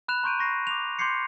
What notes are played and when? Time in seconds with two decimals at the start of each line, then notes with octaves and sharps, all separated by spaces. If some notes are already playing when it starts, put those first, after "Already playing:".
0.08 B5 F#6 E7 F7
0.23 A#5 C6 C#6 G6 D7 D#7
0.39 C#6 A#6 C7
0.67 D6 F7
0.99 C6 D6 G6 G#6 C7 C#7